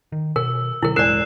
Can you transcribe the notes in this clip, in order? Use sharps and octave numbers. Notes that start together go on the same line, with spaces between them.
D#3
B2 A#4 E6
B2 D3 F#3 E4 A#4
E1 A1 G#3 A#4 D5 F#6 C7 E7